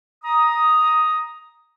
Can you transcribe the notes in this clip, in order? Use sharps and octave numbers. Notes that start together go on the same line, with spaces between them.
A#5 D#6